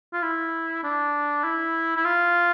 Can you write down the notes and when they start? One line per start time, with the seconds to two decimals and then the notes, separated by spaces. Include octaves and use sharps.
0.13 F4
0.23 E4
0.84 D4
1.44 E4
1.97 E4
2.05 F4